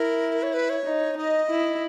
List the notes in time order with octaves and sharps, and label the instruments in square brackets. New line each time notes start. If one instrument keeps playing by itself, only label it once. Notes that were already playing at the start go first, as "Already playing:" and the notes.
Already playing: [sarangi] E4 [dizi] A#4
[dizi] C#5
B4
C#5
[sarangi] D#4
[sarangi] D#4 [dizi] D#5
[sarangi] E4